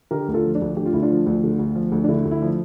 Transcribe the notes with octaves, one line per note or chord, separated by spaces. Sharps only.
D3 G4 A#4
D2
F4 A4
F3
D4
D2
D3 G4
F4
D2 E4
D4 F4
F3
D2
D3
D2
F3
D2
D4
D3 E4
D2
E4
F3